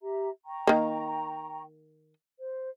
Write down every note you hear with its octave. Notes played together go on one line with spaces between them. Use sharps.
G4 E5 A#5
G5 A#5 C#6
D#3 A#3
C5